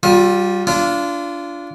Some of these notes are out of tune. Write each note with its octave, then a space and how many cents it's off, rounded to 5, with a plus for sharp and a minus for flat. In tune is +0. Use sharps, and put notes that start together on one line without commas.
G3 -15 F4 +30
D4 -20 F4 -20